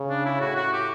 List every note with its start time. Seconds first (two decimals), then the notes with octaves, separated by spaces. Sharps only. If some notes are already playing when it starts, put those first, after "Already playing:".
Already playing: C#3
0.10 D4
0.25 E4
0.41 A2 F#4
0.56 F#4
0.72 G4